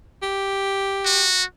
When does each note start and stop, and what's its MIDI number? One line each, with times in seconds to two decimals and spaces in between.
0.23 1.27 67
1.05 1.44 66